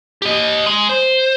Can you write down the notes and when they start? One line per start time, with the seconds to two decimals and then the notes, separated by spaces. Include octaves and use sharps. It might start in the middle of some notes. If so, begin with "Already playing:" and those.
0.22 G4 D#5
0.66 G#3
0.89 C5